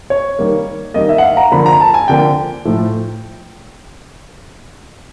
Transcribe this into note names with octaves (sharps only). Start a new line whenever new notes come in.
C#5
D#3 G3 A#3
D#3 G3 A#3 D#5
E5
F#5
F5
A#5
D3 F3 A#3 B5
A#5
A5
G#5
D3 F3 A#3 G5
A2 F3 A3